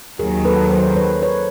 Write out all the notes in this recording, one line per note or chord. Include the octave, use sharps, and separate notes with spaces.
D#2 D#3 F#3 G#4 A#4
A4 B4
A#4 C5
B4 C#5
B4 C#5